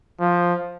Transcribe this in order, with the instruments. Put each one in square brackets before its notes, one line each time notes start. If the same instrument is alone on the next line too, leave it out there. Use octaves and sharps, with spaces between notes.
[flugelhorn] F3